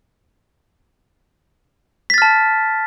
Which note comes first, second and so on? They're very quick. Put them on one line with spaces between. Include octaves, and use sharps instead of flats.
B6 A6 F6 A5